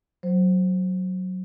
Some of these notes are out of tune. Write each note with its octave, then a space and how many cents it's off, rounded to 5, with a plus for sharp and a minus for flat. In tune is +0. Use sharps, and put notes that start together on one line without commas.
F#3 +0 C5 +0